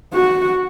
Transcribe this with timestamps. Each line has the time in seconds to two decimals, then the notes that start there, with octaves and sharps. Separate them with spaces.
0.14 F#4